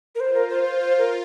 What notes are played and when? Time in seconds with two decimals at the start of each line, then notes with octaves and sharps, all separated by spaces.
0.15 A#4
0.20 F4 C5
0.35 A#4
0.49 C5
0.64 C5
0.79 C5
0.98 A#4